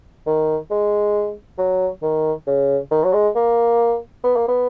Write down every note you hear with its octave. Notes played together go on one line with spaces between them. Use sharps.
D#3
G#3
F#3
D#3
C#3
D#3
F#3
G#3
A#3
B3
A#3
B3